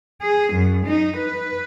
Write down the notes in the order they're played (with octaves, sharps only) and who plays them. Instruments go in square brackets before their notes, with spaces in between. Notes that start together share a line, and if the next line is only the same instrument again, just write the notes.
[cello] G#4
F#2
D#4
B4